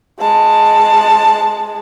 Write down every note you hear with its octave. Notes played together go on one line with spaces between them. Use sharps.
G#3 A5